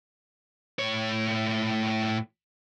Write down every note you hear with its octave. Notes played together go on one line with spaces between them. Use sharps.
A2 C#5